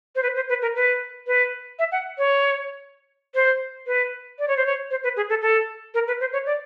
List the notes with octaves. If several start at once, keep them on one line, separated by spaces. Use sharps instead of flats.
C5
B4
C5
B4
A#4
B4
B4
E5
F#5
C#5
C5
B4
D5
C#5
C5
C#5
C5
B4
G#4
A4
A4
A#4
B4
C5
C#5
D5